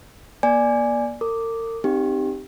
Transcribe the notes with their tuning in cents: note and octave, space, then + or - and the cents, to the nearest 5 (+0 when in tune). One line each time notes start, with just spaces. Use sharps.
A#3 +40 D5 +0 G#5 +0
A#4 -40 D6 +0
C4 +0 D#4 -25 G4 +0